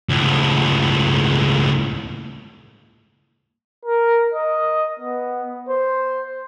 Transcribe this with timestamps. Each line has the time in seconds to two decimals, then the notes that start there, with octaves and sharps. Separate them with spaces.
0.09 C#2 A2
3.86 A#4
4.34 D#5
5.00 B3
5.69 C5